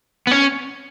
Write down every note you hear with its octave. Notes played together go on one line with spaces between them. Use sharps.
B3
C#4